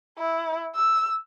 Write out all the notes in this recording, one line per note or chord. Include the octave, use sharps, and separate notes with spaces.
E4
E6